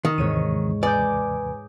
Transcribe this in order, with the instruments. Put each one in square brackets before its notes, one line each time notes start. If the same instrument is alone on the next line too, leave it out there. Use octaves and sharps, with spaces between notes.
[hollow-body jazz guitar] D#3
[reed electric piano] D#2 C3 E3 [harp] G#2 C#5 D#7
[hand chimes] B4 G#5 [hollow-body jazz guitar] D5 [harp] D6 D#6 G6